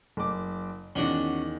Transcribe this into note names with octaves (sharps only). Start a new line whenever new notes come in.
F#1 D6
E2 D#3 C#4 D4 F#4